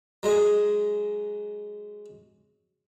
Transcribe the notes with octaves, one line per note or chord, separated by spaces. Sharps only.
F#3 G#3 D#5 G#5